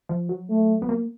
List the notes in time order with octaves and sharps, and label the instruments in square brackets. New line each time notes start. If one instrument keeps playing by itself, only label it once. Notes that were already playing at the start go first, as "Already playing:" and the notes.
[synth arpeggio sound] F3
F#3
[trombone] A3
[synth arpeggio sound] B3
A#3